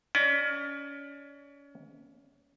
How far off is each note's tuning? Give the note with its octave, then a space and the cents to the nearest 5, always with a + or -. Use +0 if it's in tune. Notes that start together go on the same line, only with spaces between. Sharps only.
C#4 +30 D5 +35